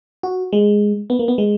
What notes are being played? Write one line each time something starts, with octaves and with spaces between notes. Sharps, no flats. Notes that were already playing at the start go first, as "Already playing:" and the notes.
F#4
G#3
B3
A#3
B3
G#3